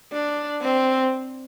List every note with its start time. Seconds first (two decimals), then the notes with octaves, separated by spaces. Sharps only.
0.12 D4
0.63 C4